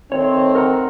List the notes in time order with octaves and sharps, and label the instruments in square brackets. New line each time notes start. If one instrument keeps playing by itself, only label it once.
[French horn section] D#3 A3 C4 [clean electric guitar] C#5
[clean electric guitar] A#4 F#5 A#5